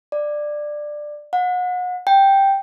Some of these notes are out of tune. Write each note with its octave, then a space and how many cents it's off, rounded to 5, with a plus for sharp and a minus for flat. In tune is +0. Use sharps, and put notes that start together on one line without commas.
D5 +15
F#5 -35
G5 +0